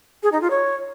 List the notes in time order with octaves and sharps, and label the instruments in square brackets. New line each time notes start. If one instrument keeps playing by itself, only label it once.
[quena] G#4
D#4
F4
C#5